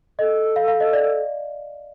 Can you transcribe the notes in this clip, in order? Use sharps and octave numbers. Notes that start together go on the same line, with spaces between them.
A4 D#5
F5
F5
D#5
D5